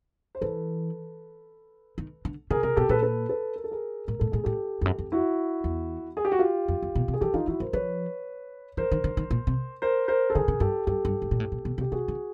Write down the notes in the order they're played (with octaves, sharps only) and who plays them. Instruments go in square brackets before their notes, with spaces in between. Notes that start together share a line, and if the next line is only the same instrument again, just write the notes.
[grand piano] C5
[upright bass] E3 [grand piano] A4 B4
[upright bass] D#3
D3
[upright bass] C#3 [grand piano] G#4 A#4
[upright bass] C3 [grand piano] G#4 A#4
[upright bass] B2 [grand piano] G4 A4
[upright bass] A#2 [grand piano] A4 B4
[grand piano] A4 B4
A4 B4
A#4
A4
G#4 A#4
[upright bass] A2 [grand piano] A#4
[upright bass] A2 [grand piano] A4
[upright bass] A2 [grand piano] G#4
[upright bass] A2 [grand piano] G4 A4
[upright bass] F2
F#2
F2
[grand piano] E4 F#4
[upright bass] E2
[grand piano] G#4
G4
F#4
F4 G4
[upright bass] F2
F2
B2
C3
[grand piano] G#4
[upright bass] E3 [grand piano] G4 A4
[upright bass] E3 [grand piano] D#4 F4
[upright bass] E3 [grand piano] E4 F#4
[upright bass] F3 [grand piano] A#4 C5
[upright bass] F3 [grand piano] B4 C#5
[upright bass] E3 [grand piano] A#4 C5
[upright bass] D#3
D3
D#3
A#2
C3
[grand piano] A#4 C5
A#4 C5
A4
[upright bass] D3 [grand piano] G#4 A#4
[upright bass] C#3
[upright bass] G2 [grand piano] G4 A4
[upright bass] G2 [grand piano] G4 A4
[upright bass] G2
G#2
A#2
A2
A#2
B2
C3
[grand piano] G4
[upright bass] C3 [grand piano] F#4 G#4
[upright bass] C#3